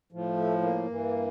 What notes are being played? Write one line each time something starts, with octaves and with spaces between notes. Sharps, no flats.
A2 F3
A3
A#3
G2 E3